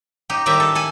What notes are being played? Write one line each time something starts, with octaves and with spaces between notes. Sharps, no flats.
D#4 G4
A2 D#3 G3 G4 E5
A4
A4 G#5